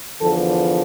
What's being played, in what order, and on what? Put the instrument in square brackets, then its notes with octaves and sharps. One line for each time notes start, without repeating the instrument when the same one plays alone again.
[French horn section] E2 D3 F3 A4